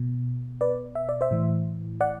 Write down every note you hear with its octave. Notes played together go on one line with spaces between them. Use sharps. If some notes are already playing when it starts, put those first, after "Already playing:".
Already playing: B2
B4 D5
E5
D5
C5 E5
A2 E3
D5 F#5